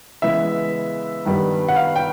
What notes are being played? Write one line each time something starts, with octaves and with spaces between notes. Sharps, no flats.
C#3 E3 G#3 B3 E5
G2 D#3 G3 B3
F#5
F5
G5